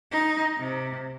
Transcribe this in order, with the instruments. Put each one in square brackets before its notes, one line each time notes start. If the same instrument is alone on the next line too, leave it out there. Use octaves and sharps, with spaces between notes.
[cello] D#4
C3